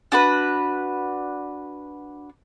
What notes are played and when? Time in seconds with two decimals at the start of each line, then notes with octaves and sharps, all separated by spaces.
0.12 D4 F#4 B4